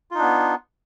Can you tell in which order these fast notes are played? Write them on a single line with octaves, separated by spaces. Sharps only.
F4 D#4 D4 B3